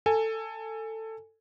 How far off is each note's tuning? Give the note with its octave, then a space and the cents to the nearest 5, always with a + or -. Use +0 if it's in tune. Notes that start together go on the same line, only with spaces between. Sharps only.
A4 +15 G#5 +0